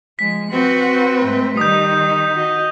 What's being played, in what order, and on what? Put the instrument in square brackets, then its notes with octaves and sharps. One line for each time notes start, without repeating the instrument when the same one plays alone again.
[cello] F3 G#3 [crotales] B6
[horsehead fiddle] C4 B4 [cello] F#4
[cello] G#2 A3
[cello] D#3 D#4 [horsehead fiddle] G3 [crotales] D#6 G6
[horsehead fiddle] F#4 D#5